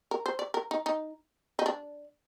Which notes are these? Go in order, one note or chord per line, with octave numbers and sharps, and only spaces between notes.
A#4
C5
D5
A#4
D#4
D#4
D#4
D4